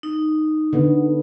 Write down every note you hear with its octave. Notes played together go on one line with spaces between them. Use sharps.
D#4
D3 B3